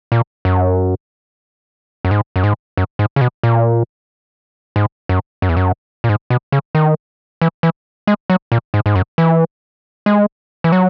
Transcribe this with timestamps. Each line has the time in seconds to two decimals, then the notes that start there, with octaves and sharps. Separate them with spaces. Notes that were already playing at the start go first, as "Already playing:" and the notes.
0.12 A#2
0.45 F#2
2.05 F#2
2.11 G#2
2.36 F#2
2.44 G#2
2.77 F#2
2.99 G#2
3.16 C#3
3.21 B2
3.43 A#2
4.76 G#2
5.09 F#2
5.42 F#2
5.49 E2
5.57 F#2
6.04 A#2
6.09 G#2
6.30 B2
6.52 C#3
6.75 D#3
7.41 E3
7.63 E3
8.07 G#3
8.30 F#3
8.52 A#2
8.74 G#2
8.86 G#2
8.95 F#2
9.18 E3
10.06 G#3
10.64 E3
10.72 F#3